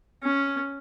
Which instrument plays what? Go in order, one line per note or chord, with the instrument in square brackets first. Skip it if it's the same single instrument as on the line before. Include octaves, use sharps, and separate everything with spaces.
[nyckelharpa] C#4